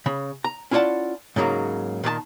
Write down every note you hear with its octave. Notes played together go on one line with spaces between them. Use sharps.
C#3 B5
A#5
C#4 E4 F4 D5 F#5 A5
G#2 C#3 F#3 G#3 A#3
A#2 D#3 D5 A5